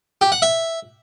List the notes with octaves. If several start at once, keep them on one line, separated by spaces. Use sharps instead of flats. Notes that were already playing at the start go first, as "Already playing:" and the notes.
G4
F#5
E5